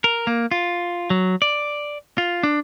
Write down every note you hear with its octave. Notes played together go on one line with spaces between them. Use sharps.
A#4
A#3
F4
F#3
D5
F4
D4